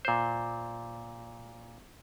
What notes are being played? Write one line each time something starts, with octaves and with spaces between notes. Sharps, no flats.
A#2 C5